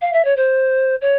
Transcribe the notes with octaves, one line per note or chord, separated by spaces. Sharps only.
F5
E5
C#5
C5
C#5